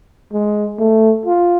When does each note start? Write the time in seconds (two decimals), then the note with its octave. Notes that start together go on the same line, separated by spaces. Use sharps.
0.32 G#3
0.78 A3
1.26 F4